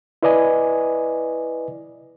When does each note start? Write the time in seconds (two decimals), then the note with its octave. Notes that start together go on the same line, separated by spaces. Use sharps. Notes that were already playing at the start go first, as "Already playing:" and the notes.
0.23 E4 B4 D5 D#5 G#5